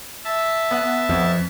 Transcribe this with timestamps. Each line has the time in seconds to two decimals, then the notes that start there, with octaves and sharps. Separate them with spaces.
0.24 E5 A5
0.71 B3 F#5
1.09 F2